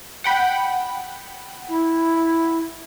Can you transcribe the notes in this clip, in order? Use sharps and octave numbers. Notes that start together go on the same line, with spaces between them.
F#5 G5 B5
E4